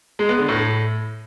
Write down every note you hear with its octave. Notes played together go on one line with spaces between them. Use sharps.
G#3
B3
D3
A2